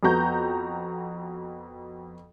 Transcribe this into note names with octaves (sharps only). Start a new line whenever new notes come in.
F2 B3 F#4 A#5 G6